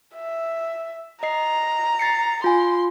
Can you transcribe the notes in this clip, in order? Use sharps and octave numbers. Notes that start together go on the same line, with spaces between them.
E5
D#5 A#5 C7
A6 C7 C#7
F4 G#5 C6